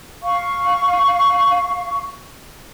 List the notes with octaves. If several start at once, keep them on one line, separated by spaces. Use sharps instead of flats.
F5 C#6